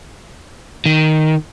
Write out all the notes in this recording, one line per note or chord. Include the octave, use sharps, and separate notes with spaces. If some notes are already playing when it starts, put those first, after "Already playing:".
D#3